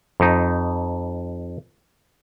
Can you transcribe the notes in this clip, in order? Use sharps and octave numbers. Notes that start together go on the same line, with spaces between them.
F2 D#4